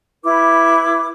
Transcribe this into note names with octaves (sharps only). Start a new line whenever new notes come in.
E4 B4 D6